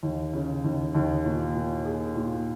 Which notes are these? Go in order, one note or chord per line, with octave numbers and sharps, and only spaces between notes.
D#2
C#3
D#2
D#2
A#2
A#2
G#4
A#2